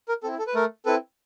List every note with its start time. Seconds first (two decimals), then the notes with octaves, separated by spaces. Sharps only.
0.08 A#4
0.23 C4 E4 A4
0.39 A4
0.47 B4
0.55 A3 A#4
0.85 C4 E4 A4 B4